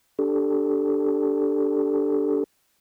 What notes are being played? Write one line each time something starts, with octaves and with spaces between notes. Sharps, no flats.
D4 G4 A4